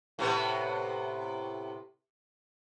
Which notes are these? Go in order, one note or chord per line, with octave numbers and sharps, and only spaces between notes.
A2 C3 B3